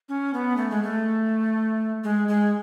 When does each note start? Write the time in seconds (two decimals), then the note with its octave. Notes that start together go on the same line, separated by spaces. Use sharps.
0.09 C#4
0.34 B3
0.57 A3
0.70 G#3
0.83 A3
2.04 G#3
2.28 G#3